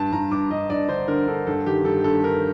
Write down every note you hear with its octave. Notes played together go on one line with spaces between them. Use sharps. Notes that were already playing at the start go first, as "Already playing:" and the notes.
Already playing: G2 A5
G2 A#5
G2 D6
G2 D#5
G2 D5
D3 C5
D3 A#4
D3 A4
G2 A4
D#3 G4
G2 A4
G2 A4
G2 A#4